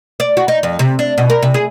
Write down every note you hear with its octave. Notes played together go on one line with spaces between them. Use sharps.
D5
F#4
D#4
F2
C3
D4
B2
A#4
C3
G#4